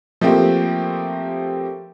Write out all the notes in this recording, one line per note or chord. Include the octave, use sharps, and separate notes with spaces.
F3 A3 A#3 C4 G4